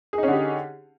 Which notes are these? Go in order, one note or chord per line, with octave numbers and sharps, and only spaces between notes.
D3 C#4 D#4 G4 G#4